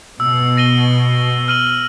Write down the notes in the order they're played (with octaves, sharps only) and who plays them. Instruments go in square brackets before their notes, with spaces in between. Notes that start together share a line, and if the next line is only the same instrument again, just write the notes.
[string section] B2 [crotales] E6
[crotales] A#6 D#7 G7
F6 D#7 F#7